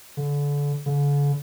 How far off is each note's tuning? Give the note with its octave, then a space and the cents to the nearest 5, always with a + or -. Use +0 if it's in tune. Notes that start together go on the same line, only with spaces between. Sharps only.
D3 -30
D3 -45